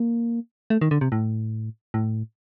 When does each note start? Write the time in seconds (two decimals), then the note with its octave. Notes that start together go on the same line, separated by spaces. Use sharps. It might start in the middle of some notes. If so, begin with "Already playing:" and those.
Already playing: A#3
0.70 A3
0.81 D#3
0.91 D3
1.01 C3
1.12 A2
1.94 A2